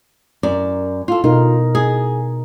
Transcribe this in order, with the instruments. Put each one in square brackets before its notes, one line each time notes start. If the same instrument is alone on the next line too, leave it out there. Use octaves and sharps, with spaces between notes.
[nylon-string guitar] F#2 A#4 D5
F4 A4
[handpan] B2 D#4 A#4 [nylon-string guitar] F4
[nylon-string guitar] G#4